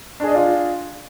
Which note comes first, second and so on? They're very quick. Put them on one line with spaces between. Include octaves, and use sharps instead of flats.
D4 G#4 D#5 D5 F4